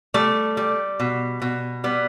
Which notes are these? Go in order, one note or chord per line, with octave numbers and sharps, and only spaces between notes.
G3 A3
G3
B2
B2
G3 B3